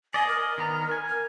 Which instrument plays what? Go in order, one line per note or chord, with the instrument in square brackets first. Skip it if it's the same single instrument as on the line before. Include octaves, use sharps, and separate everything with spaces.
[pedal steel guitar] D5 D#5 [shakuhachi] G#5
[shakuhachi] A#4
[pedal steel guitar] D#3 B3 A#5
G#5
[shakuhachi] A#4